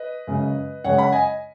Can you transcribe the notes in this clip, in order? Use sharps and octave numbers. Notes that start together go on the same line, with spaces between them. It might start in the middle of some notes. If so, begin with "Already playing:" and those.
Already playing: B4 D#5
F#2 C#3 G#3
F#2 C#3 G#3 C#5 F#5
F#5 B5
D#5 G#5